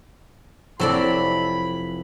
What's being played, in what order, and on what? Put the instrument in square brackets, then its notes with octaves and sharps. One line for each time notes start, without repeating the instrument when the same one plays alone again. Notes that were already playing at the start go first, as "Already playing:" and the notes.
[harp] F1 [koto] F#3 A4 D5 [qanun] C4 E4 A#5 [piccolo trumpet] B5